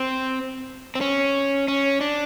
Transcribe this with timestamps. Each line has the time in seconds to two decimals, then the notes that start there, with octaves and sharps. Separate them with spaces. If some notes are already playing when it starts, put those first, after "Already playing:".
Already playing: C4
0.95 C4
1.01 C#4
1.68 C#4
2.01 D4